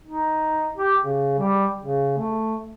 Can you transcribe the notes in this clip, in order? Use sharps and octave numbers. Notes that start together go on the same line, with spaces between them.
D#4
G4
C#3
G3
C#3
A3